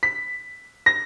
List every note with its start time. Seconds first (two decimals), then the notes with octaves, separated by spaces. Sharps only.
0.03 B6
0.86 A#6